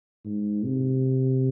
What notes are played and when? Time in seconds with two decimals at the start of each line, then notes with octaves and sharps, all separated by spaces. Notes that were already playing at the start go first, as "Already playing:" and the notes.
0.25 G#2
0.65 C3